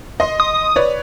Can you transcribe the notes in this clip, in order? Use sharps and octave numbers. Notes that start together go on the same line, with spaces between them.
D#5 C6
D#6
B4 C#5 D5